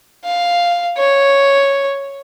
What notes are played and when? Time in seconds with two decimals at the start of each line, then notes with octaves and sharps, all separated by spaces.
0.24 F5
0.97 C#5